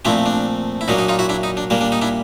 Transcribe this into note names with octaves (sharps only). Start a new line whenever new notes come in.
A#2 F3 A3 C4 D4 E4
D4
E4
A#2 F#3 A#3 D4 D#4
D#4
D#4 F4
E4 F#4
D4 E4
D#4
D4
A#2 G3 A#3 D4
D4
D#4
D4 E4